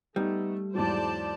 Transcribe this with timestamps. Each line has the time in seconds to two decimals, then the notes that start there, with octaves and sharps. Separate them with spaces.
0.16 G3 A3 B3 D#4
0.75 E2 G#2 F#3 C5 D5 A5